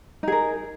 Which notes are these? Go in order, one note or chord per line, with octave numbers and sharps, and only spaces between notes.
D#4 G#4 A#4